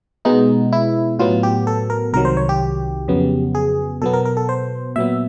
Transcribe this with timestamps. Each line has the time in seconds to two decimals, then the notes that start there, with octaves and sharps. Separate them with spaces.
0.25 B2 G#3 B3 D#4
0.72 E4
1.19 A2 F#3 B3 F4
1.43 G4
1.67 A4
1.90 A#4
2.13 C2 C3 D#3 F#3 A#4
2.25 C5
2.37 C#5
2.49 G4
3.08 F2 C#3 F#3 B3
3.55 G#4
4.02 B2 F#3 B3 A4
4.13 A#4
4.25 A#4
4.37 A4
4.49 C5
4.96 A#2 F#3 B3 E5